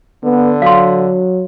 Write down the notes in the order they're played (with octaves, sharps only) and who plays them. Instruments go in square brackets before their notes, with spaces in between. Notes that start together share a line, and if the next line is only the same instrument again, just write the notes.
[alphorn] D3 [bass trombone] B3
[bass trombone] F#3 [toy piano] F5 C6